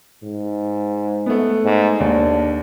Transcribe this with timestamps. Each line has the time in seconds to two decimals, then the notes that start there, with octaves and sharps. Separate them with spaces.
0.24 G#2
1.26 A3 B3
1.64 G#2
2.00 D#2 D4